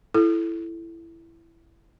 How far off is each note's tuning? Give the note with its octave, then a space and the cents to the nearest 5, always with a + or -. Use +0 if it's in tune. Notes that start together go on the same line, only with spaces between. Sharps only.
E4 +10 A4 -10